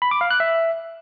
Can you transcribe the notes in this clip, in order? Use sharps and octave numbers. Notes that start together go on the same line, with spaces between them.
B5
D6
F5
F#6
E5